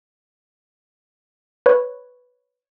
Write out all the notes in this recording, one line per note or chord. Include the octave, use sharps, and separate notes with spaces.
B4 C#5